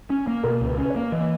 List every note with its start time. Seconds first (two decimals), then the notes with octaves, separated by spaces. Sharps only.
0.10 C#4
0.27 A#3
0.43 B2 A#4
0.61 C#2
0.67 B4
0.78 C#4
0.85 B4
0.90 C#5
0.96 A#3
1.12 E3 D#5